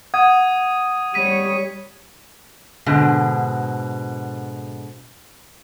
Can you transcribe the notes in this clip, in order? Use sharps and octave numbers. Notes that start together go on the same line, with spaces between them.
F#5 D#6 G#6 D#7
G3 C#5 B6 D#7
G#2 B2 D3